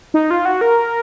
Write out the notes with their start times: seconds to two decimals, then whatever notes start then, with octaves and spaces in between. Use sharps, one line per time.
0.14 D#4
0.31 F4
0.45 F#4
0.61 A#4